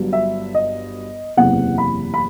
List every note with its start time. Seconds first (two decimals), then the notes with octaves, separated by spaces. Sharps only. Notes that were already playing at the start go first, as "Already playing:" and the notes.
Already playing: G1 G2 F#3
0.13 E5
0.55 D#5
1.37 F#1 E2 C3 E3 F#5
1.78 B5
2.14 B5